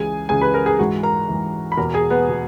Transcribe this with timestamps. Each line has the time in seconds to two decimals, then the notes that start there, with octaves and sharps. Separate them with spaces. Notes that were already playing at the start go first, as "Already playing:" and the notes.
Already playing: C#2 C#3 E3 G#4 G#5
0.29 C#2 C#3 E3 G#4 G#5
0.41 B4 B5
0.54 A#4 A#5
0.66 G#4 G#5
0.78 G#2 E3 F#4 F#5
1.03 A#4 A#5
1.29 G#2 E3
1.72 B5
1.77 E2 B2 A#4 A#5
1.94 G#4 G#5
2.10 B3 B4
2.28 B2